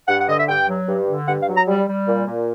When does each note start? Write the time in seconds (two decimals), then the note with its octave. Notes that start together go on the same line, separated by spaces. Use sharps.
0.08 G2 F#5
0.19 F#5
0.28 D3 D#5
0.38 E5
0.48 G2 G5
0.68 F#3
0.88 G2
1.08 D3
1.28 G2 F#5
1.41 F5
1.48 F#3
1.54 A#5
1.67 G3
1.87 G3
2.07 A#2
2.26 A#2